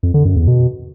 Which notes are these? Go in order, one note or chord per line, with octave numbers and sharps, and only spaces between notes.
F2
D3
F#2
E2
B2